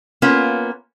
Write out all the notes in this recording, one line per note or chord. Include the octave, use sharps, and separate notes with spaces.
A#3 B3 C#4 F4